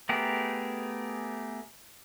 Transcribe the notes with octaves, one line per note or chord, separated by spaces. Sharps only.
A3 B3 G4 G#4 A#4